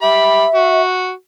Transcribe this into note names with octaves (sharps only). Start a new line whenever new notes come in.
G4 E5 B5
F#4